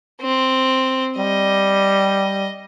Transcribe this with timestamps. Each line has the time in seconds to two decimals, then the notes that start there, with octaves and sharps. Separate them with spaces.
0.21 C4
1.18 G3 D#5